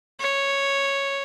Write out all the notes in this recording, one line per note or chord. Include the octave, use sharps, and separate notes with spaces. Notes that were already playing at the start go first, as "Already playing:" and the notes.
C#5